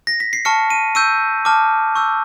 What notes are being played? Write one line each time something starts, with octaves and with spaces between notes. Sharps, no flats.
A#6
B6
C7
A5 C#6 F6 C#7
D#7
C#6 E6 G6 D#7
A5 D6 F6
C#6 E6 G6